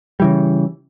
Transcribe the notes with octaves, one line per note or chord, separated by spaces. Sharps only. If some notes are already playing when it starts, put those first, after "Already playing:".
C#3 E3 G3